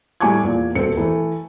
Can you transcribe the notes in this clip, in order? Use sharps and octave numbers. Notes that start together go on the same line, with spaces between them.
A2 G3 G#5 C#6 D6 G#6
E2 A#2
D#1 B2 A3 C4 C#7
E3 A3